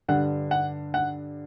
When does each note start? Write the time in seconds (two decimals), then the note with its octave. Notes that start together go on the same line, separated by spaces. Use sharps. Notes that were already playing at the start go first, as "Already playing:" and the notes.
0.08 G2 D3 F#5
0.51 F#5
0.94 F#5